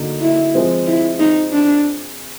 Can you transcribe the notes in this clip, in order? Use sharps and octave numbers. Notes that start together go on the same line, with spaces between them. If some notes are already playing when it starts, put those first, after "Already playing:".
Already playing: D3 F#3 A#3 D#4
E4
F3 G#3 C4
E4
D#4
D4